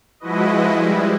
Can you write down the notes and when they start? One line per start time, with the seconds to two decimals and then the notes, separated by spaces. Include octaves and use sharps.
0.20 F3 G#3 E4 F#4 B4 D#5
0.76 G3 G#3 E4